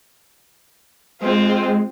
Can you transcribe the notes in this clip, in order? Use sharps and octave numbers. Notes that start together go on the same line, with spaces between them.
G#3 C4 F4